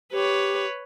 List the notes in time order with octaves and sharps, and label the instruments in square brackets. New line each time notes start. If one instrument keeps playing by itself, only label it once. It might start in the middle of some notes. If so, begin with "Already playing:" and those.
[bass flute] G4 [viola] B4 C#5